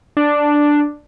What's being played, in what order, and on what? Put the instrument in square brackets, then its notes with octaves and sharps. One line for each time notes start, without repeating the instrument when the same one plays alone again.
[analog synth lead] D4